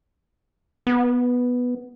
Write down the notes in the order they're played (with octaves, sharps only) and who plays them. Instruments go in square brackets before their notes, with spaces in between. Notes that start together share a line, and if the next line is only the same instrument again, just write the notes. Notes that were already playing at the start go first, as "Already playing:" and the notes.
[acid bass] B3